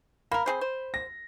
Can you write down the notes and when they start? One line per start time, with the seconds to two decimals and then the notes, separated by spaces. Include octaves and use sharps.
0.31 A#3 A#4 B5
0.46 C4 G#4 C5
0.61 C5
0.94 A#6